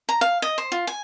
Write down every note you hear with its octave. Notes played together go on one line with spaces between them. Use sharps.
A#5
F5
D#5
C5
F4
G#5